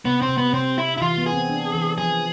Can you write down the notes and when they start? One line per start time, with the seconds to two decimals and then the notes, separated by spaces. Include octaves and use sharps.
0.05 C3 B3
0.22 C4
0.29 C3
0.37 B3
0.53 C3 C4
0.78 E4
0.97 E4
1.02 E3 F4
1.18 B3
1.26 G#4
1.33 C4
1.50 D4
1.74 E3
1.98 F3 G#4